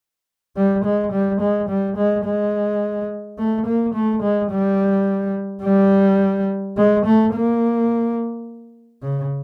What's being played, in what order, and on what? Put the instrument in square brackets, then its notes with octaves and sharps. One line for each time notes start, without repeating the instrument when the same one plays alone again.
[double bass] G3
G#3
G3
G#3
G3
G#3
G#3
A3
A#3
A3
G#3
G3
G3
G#3
A3
A#3
C#3